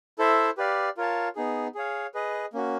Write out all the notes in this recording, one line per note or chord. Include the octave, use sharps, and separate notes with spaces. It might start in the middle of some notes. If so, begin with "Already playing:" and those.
E4 A4 C5 E5
G4 B4 D5 F5
F4 A#4 C#5 F5 A5
B3 D#4 G#4
G#4 C#5 F5
G#4 B4 D#5
A#3 C#4 F#4